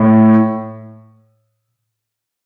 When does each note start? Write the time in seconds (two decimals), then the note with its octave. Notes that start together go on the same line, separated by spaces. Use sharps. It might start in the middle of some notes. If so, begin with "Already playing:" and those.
Already playing: A2